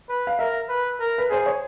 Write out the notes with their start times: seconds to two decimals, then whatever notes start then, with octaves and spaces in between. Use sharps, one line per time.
0.09 B4
0.27 F5
0.39 A#4 E5
0.69 B4
1.00 A#4
1.18 B4
1.30 G#4 C5
1.46 C#5